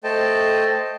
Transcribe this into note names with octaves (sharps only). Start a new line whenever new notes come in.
A3 A4 C5 D#5 G5 A5